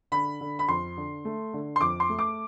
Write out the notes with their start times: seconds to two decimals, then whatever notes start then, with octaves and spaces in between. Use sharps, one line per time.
0.12 D3 B5
0.40 D3
0.59 B5
0.68 F2 C6
0.97 D3
1.25 A3
1.54 D3
1.76 C6
1.81 F2 D6
2.00 C6
2.09 A3
2.19 D6